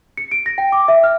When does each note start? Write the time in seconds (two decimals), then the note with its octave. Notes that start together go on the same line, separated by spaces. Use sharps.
0.17 C#7
0.32 D7
0.46 A#6
0.58 G5
0.72 D6
0.88 E5
1.04 F6